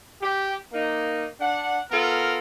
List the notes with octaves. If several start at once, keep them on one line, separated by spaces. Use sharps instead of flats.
G4
A#3 D#4
D4 F#5
B3 F4 A4 A#4